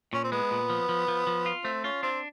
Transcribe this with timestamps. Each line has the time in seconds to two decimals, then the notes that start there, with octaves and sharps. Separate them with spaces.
0.13 A#2 C#4
0.24 C4
0.32 G#3 B3
0.51 A#2
0.70 F3
0.89 F3
1.08 F3
1.27 F3
1.46 F4
1.64 A3 C4
1.84 C#4 F4
2.03 C4 D4